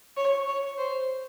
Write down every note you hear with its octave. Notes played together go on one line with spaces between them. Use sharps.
C#5
C#5
C5